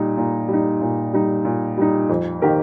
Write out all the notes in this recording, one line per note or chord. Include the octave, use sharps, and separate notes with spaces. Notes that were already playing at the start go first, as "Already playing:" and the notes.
Already playing: A#2 G3 D#4
A#2
G3
D#4
A#2
G3 D#4
A#2
G3 D#4
F2
D#3 A#3 G4 A#4